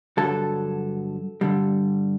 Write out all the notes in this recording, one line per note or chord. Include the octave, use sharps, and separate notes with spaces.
G2 D3 F#3 A4
G2 D3 G3